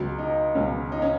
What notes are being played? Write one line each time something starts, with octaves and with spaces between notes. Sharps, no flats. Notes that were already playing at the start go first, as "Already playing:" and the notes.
Already playing: C#2 B2 F#3
D#4
C#2 B2 F#3 C#4
D#4
C#4